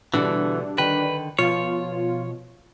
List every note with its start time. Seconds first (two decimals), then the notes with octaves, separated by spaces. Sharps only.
0.14 B2 D3 E3 G3 D4 F#4
0.78 D3 D#3 B4 G5
1.39 B2 F3 F4 C#5